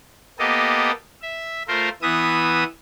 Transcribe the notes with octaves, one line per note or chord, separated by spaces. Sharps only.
A#3 B3 G4 A4 D#5
E5
A3 F4 A#4 C5
E3 B3 E5 D#6